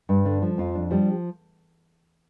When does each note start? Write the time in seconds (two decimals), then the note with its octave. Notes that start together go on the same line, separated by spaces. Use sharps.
0.09 G2
0.25 D3 D4
0.42 F3
0.58 F2 F4
0.75 D4
0.91 F3 G3 G4